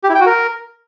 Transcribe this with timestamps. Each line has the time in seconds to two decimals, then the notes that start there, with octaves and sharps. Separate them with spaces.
0.04 G4
0.09 E4
0.15 G5
0.20 F#4
0.26 A#4